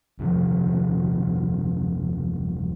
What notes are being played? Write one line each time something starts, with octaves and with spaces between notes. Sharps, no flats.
D#1 C3 F3